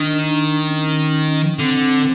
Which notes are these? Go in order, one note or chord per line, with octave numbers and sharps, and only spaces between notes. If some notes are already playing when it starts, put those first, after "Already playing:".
Already playing: D#3 D4
C#4
D3 C4